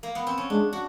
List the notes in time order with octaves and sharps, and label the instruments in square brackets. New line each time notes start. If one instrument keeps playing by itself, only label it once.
[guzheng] A#3
B3
C4
C#4
[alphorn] G#3 [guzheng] D4
[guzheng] F#4